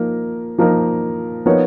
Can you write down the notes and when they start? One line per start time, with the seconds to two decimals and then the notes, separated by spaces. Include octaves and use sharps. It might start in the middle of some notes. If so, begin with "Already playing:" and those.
Already playing: F3 A#3 D#4 A#4
0.58 F3 A#3 D#4 A#4
1.46 F3 B3 D#4 A#4 C#5